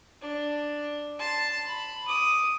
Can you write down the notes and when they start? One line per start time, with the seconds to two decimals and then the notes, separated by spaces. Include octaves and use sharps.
0.21 D4
1.19 A5 C6
1.68 B5
2.07 D6 D#6